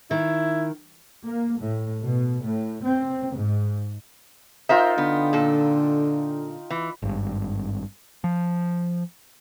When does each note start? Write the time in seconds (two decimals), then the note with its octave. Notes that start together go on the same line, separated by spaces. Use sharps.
0.11 D#3 E4
1.26 A#3
1.61 A2
2.02 B2
2.43 A2
2.83 C4
3.34 G#2
4.69 D#4 F4 A#4 C5 E5 G5
4.98 D3 B3
5.33 A#2 A4
6.70 E3
7.02 G#1 G2
8.24 F3